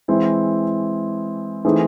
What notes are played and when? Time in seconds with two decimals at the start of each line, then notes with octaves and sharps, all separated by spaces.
0.08 E3 G#3 C4 E4
1.65 E3 A3 C4 D#4 G#4